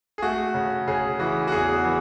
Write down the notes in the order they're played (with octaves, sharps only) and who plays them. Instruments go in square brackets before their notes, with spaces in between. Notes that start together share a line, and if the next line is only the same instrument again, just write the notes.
[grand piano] G#4
A3 F#4
C#3
C#3 G#4
E3 F#4
F#4
E2 G#4
E3